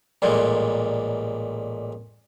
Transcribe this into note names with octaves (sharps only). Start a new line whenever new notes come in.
A1 A#2 G3 G#3